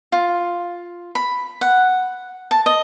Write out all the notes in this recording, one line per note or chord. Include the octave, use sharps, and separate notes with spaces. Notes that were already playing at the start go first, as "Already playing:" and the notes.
F4
B5
F#5
A5
D#5